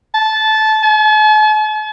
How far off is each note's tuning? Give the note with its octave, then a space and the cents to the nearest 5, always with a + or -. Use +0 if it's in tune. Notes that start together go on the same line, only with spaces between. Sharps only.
A5 -15
A5 -45